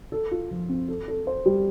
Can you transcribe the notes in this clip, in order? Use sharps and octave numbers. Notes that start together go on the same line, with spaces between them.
A4
F4
F3
C4
A4
A4
C5
G3